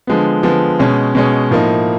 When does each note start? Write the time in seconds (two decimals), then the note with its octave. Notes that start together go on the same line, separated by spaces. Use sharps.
0.07 D3 F3 G#3 B3
0.43 D3 F3 G#3 B3
0.79 B2 G#3 C#4
1.15 B2 G#3 C#4
1.51 A2 F3 A#3 D#4